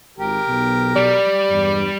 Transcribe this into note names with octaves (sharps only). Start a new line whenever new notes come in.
G#1 G4 A#4
B1 B2
G3 D5
E2 G2